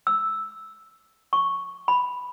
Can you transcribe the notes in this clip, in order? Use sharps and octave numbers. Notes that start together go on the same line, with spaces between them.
E6
C#6
B5